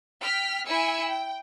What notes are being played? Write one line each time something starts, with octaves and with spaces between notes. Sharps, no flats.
G5 F6 B6
E4 G#5 E6 C#7
G5